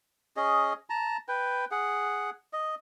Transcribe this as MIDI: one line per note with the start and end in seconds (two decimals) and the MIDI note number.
0.36 0.73 61
0.36 0.73 68
0.36 0.73 75
0.90 1.17 81
0.90 1.17 82
1.28 1.65 71
1.28 1.65 79
1.71 2.30 68
1.71 2.30 78
2.53 2.75 75